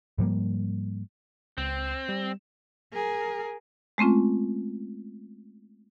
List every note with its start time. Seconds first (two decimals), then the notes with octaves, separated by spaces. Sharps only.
0.18 G#2 F3 G3 A#3
1.58 C#2 C4
2.09 G3
2.93 G#4 A#4
3.98 G#3 A3 C4 C#4 F4